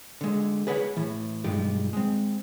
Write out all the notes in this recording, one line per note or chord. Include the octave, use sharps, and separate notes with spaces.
D3 G#3
G#4 B4 C#5 F#5
A2 E3
B1 G2 G#3 F4 G4
G#3 C4